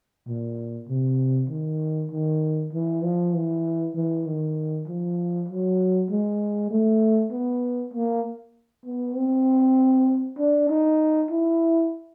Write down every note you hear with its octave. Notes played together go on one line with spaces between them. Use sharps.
A#2
C3
D#3
D#3
E3
F3
E3
E3
D#3
F3
F#3
G#3
A3
B3
A#3
B3
C4
D4
D#4
E4